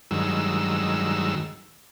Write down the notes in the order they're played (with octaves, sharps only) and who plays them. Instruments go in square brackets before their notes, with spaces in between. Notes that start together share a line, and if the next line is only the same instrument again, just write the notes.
[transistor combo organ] G2 D#3 F#3 G#3 E6